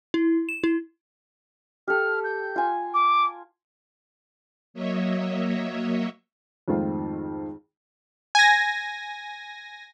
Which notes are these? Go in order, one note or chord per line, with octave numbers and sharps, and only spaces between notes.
E4
E7
E4
G4 A4 F6
G6
F4 G#5
D6
F#3 A#3 C#5 D#5 E5
F2 G#2 D#3 A3 C4 F4
G#5 A#6